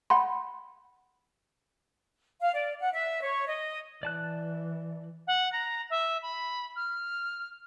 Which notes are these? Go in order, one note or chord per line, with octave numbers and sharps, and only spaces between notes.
F#5 B5 C6
F5
D5
F#5
E5
C#5
D#5
E3 D5 A5 F#6
F#5
A#5
E5
B5
F6